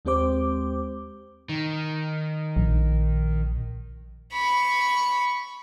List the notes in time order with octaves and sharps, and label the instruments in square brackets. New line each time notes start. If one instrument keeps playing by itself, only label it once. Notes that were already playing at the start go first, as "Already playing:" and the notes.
[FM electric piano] D#2 G#3 C4 G4 C5 D6
[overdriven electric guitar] D#3
[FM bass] A#1
[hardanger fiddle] B5 C#6